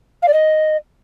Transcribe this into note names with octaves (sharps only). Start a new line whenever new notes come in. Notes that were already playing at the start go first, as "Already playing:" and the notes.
F5
D5
D#5